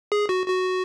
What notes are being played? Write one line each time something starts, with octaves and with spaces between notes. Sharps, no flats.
G#4
F#4
F#4